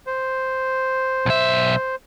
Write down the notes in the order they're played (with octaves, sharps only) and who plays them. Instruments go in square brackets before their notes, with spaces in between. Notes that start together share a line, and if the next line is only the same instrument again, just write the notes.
[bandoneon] C5
[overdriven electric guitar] B1 E5